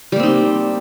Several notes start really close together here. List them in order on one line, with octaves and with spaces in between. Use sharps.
G3 A#3 C4 D#4